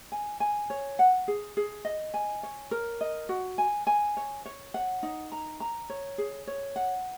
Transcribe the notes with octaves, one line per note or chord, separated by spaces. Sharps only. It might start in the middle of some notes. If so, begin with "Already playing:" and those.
G#5
G#5
C#5
F#5
G#4
G#4
D#5
G#5
C#5
A#4
D#5
F#4
G#5
G#5
C#5
C#5
F#5
D#4
A#5
A#5
C#5
G#4
C#5
F#5